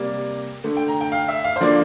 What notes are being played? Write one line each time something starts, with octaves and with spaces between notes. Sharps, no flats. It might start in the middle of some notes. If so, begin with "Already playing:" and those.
Already playing: C3 G3 A#3 D5
D3 A3
G5
A#5
G5
F5
E5
F5
C5
D3 F3 A#3 D5